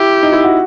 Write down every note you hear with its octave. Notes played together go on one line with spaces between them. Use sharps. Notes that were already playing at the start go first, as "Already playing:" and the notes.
Already playing: E4 G4
D#4
E4
F#4